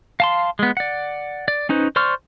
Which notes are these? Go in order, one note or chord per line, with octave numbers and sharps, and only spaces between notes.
F5 A5 C6
G#3 B3
D5 F#5
D5
C#4 D#4 B4 C5
C5 D5 C6 C#6 F6